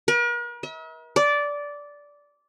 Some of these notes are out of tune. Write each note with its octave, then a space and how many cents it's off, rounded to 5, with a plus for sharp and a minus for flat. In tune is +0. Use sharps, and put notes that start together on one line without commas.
A#4 +45
E5 -45
D5 -15